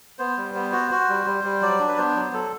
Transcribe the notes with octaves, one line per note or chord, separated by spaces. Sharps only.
B3 C5
G3
B3
F#4
F#4
G3
G3
G3
F#3 D5
D4
B4
B3 C5
F#3
F#3 A4